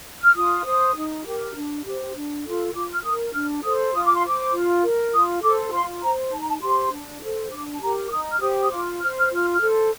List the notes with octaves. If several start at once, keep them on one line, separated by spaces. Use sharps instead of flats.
F6
F4 D#6
C5
D#4
G4 A#4
D4
G4 C5
D4
F4 A4
F4 D6
F6
A#4 D#6
D4 F6
A4 C5 D#6
F4 D#6
D6
C6
C5 D6
F4
A#4
F4 D#6
A4 C5 D6
F4 C6
C5 A#5
D#4 A5
A#5
A5
G4 C5 C6
D4
A4 C5
D4 D6
A5
G4 A#4 A#5
D6
D#4 D#6
F6
G4 C5 D#6
D#6
F4 D6
C5 F6
F6
F4
F6
F6
A4 C5